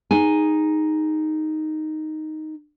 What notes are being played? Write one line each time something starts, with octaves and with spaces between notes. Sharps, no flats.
D#4 G#4 G#5